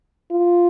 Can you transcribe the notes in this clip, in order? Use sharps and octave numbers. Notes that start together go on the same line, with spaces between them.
F4